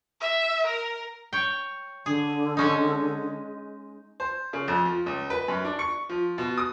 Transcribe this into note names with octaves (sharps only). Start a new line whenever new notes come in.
E5
A#4
C#5 G5
D3 G#4
G#3 C#4 D#4
C5
C#3
F2
F3
C#2
B4
F#2
D4
C#6
F3
B2
D#6